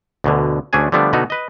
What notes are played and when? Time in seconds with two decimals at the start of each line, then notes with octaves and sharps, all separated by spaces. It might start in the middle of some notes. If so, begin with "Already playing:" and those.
0.24 D2 B2 D3
0.73 D2 A3 C#4 D4 G#4 G#5
0.92 D3 F3 G3 A3 B3 D4
1.13 B2 D3 B3 D#4 F#4
1.30 B4 D#5